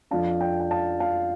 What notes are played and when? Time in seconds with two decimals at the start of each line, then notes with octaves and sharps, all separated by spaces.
0.11 F2 F3 D4 F5 A5
0.41 D5 G5
0.60 G5
0.71 F5 A5
1.00 F5 A5